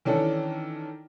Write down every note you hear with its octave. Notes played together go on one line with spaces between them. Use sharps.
D#3 E3 C#4 D4 A4